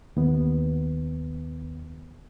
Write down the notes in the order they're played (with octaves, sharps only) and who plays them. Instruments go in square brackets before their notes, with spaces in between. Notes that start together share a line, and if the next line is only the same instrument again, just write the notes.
[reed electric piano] D#2 B3